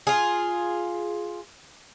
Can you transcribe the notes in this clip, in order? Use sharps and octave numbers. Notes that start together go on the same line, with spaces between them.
F4 G#4